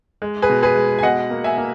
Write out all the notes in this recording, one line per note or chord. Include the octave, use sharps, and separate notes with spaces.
G#3
G#4 B4
B2
G#4 B4
G#3
G#5
B2 D#5 F#5
A#3
E5 G#5
A#3